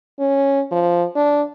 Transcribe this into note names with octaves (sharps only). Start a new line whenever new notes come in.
C#4
F3
D4